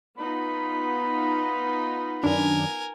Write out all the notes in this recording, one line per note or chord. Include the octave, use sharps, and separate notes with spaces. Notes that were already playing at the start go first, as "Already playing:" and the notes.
B3 D#4 F4 B5
F#2 D#3 D4 A#4 G#5